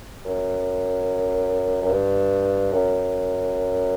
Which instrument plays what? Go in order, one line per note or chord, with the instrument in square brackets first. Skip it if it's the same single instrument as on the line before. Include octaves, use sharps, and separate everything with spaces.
[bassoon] F#2
F#2
G2
F#2